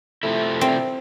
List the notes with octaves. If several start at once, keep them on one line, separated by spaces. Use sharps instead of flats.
C3 F3 A3 E4
C4